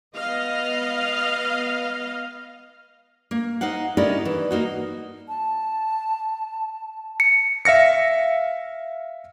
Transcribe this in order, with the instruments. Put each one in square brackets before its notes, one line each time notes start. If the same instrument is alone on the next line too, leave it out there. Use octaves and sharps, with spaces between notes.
[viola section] B3 D#5 F5
[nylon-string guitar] A#3
D#4 C5 F5 F#5
C#4 D#4 E4 G4 A#4 D5
E3
A#3 D#4 F#4
[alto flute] A5
[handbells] C#7
[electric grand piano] E5 F5 A#6 C#7